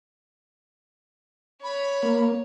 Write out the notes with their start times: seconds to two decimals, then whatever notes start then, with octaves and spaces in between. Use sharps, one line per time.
1.63 C#5 B5
2.03 A#3